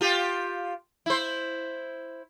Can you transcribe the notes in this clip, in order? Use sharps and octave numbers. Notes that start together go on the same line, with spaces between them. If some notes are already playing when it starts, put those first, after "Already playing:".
F4 G4
E4 C5